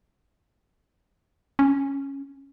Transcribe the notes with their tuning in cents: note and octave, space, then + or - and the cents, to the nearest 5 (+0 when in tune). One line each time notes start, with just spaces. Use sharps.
C#4 -5